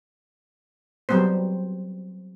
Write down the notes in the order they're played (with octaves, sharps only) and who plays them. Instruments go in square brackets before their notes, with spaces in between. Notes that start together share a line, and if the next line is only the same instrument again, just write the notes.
[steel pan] F#3 G3 B3 C4 C5